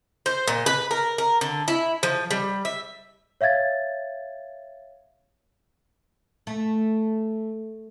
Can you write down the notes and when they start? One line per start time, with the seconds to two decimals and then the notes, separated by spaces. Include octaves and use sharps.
0.26 C5
0.48 A#2
0.66 B4
0.91 A#4
1.18 A#4
1.41 D3
1.68 E4
2.03 F3
2.31 G3
2.65 E5
3.41 C#5 E5 F5 G#6 A6
6.47 A3